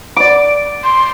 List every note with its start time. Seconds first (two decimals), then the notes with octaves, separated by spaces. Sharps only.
0.16 D5 D6
0.84 C6